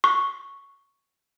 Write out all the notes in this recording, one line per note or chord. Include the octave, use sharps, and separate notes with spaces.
C#6